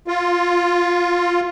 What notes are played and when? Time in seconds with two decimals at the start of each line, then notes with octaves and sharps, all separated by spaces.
0.07 F4